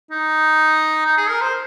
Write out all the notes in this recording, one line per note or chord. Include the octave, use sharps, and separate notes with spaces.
D#4
D#4
G#4
A#4
C5